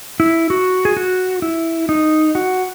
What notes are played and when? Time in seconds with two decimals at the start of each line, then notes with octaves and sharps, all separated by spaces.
0.20 E4
0.50 F#4
0.85 G#4
0.97 F#4
1.42 E4
1.89 D#4
2.35 F#4